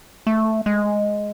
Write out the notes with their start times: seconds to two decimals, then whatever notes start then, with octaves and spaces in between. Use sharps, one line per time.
0.27 A3
0.66 G#3